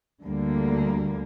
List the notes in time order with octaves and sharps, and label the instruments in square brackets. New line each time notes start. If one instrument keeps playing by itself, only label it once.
[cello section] D2 D3 G3 A#3